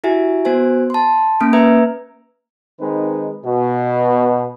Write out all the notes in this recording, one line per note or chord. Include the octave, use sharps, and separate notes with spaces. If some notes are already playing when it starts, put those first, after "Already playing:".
E4 F#4 G4 E5 G#5
B3 F#4 C5 G#5
A5 C6
A#3 C#4 F6 D7
B4 E5 A#5 E6 G#6
D#3 G#3 C4 D#4 B4
B2